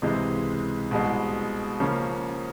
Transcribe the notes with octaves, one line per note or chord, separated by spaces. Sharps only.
C#2 C3 E3 G#3
C2 B2 G#3
C#3 F3 A#3 C#4